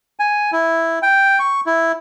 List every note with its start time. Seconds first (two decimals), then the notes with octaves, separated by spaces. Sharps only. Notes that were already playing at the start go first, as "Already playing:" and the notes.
0.20 G#5
0.52 E4
1.03 G5
1.39 C#6
1.66 E4